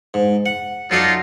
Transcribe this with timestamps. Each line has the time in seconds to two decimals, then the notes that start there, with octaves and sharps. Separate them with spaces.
0.14 G#2
0.46 F#5
0.91 F#3 D#4 F4 A4 D5